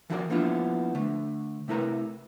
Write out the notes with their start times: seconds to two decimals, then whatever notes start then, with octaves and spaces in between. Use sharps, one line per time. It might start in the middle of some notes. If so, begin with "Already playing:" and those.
0.10 E3 F3 F#4 A#4 C5 D5
0.30 F3 A#3 B3 D4 E4 F4
0.95 D3 A3
1.68 C3 A3 E4 A#4 B4 A#5